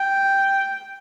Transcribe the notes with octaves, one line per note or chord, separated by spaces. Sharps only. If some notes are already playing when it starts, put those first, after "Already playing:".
Already playing: G5